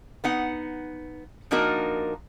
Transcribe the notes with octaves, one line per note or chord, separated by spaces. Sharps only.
B3 D#4 F#5
F3 A#3 D4 D#4 F#4 A#4